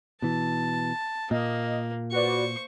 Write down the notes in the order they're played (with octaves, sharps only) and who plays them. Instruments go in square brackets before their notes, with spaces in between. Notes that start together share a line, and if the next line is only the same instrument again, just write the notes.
[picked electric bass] B2 E3 [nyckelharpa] A5
[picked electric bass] A#2 [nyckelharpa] A#3 [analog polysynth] D#5
[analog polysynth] F#4 B4 D5 [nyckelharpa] C5 C#6